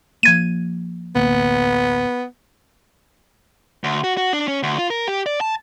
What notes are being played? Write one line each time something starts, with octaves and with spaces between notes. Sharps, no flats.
F3 A#3 G#6 D#7
A1 D2 A#3 B3
D2
F#4
F#4
D4
C#4
D2
F4
A#4
G4
D5
A5